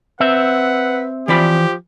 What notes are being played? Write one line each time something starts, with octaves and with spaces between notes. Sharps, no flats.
C4 B4 E5 F#5
E3 F3 G4 D5 B5